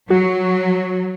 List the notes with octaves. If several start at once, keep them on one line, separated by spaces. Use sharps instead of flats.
F#3 F#4